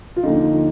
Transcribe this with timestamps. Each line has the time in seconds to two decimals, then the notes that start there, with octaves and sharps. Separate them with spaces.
0.16 F4
0.23 D#2 D3 F3 D#4